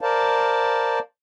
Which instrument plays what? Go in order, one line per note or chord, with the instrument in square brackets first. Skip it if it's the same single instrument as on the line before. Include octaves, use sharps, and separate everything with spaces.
[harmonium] A#4 C5 D5 F5 A5